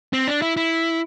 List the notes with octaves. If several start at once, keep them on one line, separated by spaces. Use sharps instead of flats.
C4
D4
E4
E4